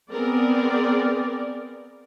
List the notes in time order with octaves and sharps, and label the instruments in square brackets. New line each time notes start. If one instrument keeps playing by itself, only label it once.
[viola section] B3 C4 G#4 A#4 D5